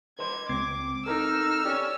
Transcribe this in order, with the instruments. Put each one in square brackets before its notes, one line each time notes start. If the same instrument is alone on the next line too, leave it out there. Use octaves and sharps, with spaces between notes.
[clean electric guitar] B4 D#5 C6 [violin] G#6
[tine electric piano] C#2 G#6 C7 [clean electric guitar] C4 [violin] D6
[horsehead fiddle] D#4 [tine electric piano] A4 A#4 [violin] E6 F6
[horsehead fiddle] C#4 [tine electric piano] G4 D5